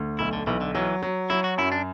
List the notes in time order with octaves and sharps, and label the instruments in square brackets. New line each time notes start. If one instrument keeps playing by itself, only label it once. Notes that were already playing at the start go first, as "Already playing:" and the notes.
Already playing: [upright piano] D2
[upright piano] B1 [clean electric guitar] E4
[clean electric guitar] D3
[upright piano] B1 [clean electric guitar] E3
[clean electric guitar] D3
[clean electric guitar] E3 [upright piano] F#3
[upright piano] F#3
[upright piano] F#3 [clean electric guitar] E4
[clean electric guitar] F#4
[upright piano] F#2 [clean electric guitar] E4
[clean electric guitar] D4